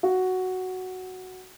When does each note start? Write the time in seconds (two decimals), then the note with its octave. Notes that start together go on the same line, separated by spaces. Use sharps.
0.03 F#4